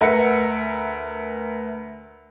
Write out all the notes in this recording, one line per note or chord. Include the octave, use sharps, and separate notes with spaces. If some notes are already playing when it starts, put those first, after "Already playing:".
D2 A#4 B4 E5 F#5 C#7